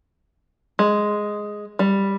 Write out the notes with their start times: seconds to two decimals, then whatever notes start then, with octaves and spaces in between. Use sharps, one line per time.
0.79 G#3
1.79 G3